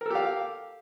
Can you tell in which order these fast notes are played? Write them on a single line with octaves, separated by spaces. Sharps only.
A#4 A4 G4 F5